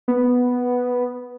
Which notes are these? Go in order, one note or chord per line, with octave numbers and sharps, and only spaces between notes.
B3